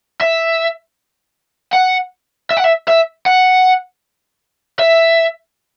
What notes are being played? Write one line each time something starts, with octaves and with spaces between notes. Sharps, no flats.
E5
F#5
E5
F#5
E5
E5
F#5
E5